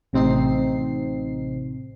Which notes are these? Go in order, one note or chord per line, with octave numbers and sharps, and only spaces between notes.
A1 C3 C4 D#4 C7